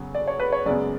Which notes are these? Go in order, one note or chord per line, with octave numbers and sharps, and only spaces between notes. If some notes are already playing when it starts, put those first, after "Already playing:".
Already playing: C#3 F#3 B3
D5
C#5
B4
C#5
F#2 C#3 G#3 B3 D5